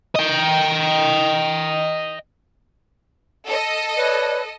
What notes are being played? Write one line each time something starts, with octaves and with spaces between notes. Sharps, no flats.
D#5 G5
A4 D#5
B4 C#5 D5